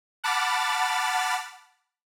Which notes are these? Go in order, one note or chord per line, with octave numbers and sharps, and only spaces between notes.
F#5 A5 B5 D6 F6 A6